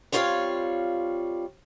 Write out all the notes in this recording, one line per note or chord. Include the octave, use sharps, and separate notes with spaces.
G3 C4 F4 C#5 F5